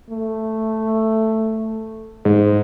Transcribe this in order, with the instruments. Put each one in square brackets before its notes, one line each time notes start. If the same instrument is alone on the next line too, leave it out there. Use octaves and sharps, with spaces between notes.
[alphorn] A3
[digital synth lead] G#2